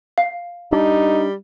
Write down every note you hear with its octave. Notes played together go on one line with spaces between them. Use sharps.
F5
G3 D4 D#4